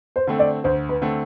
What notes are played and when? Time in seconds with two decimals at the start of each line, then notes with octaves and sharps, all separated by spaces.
0.16 C5
0.27 D3 A3 C4
0.39 D5
0.64 D2 C5
0.89 B4
1.02 D3 A3 C4